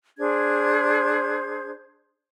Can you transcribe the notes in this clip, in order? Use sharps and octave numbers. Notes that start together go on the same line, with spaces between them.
D4 G#4 C5 G#6